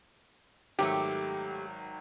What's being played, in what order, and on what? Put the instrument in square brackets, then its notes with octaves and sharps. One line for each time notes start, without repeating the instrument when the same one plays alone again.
[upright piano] G#1 D#3 F#3 [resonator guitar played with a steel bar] A3 G4